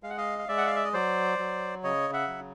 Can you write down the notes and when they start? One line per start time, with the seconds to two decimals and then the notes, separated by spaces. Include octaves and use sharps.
0.03 G#3 F5
0.10 F#5
0.17 D#5 F5
0.39 F5
0.48 G#3 D5 E5
0.58 F#5
0.67 F5
0.75 E5
0.85 D#5
0.93 F#3 C5 D5
1.38 F#3
1.83 C#3 C#5 D#5
2.13 E5 F#5
2.28 F#3